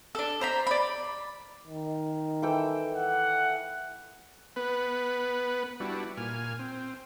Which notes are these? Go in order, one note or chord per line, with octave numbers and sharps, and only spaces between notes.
D4 A4
C5 A#5 B5
D5 B5
D#3
E3 A4 G5
F#5
B3 B4
G3 D4 E4 F#4
A#2 G#5 F6
C4